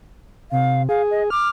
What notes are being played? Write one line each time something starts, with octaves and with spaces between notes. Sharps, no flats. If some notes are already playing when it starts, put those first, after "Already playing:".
C3 F5
G#4 F5
D#5
D6 F6